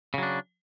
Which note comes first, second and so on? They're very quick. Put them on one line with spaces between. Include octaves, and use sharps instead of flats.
C#3 F#3 D4